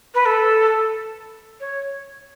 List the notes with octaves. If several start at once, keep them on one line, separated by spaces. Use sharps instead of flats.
B4
A4
C#5